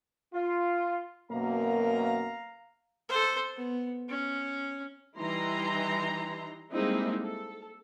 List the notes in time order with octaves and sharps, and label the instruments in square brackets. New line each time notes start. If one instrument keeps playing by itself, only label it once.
[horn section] F4
[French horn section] F#2 B2 A#3 [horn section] F5 A#5
[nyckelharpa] A4 C5
B3
C#4
[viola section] E3 G3 D#4 E4 A#5 C6
G3 G#3 A#3 C4 D#4 E4
A4